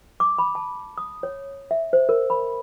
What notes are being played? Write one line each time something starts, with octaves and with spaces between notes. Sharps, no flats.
D6
B5
A5
D#6
C#5
E5
C5
A#4
B5